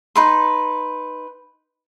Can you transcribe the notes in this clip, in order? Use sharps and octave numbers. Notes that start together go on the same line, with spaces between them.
D#4 B4 C6